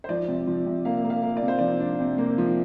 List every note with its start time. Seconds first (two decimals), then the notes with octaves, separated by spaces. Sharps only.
0.04 C5
0.09 F3 D5
0.28 C3
0.47 F3
0.66 C3
0.85 A#3 F5
1.04 A#3
1.10 F5
1.23 A#3
1.37 D5
1.42 C3
1.48 C5
1.59 F3 D5
1.80 D4
2.00 C3
2.18 A#3
2.38 F3